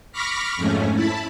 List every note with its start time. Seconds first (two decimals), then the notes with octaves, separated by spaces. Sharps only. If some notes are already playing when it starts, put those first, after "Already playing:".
0.12 B5 C#6 D6 F6 A#6 B6
0.56 F2 G#2 A3 C#4
0.94 E4 A5 B5